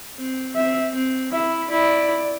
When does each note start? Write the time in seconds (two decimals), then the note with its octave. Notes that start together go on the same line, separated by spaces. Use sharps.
0.17 C4
0.56 C4 E5
0.94 C4
1.32 E4 E5
1.70 E4 D5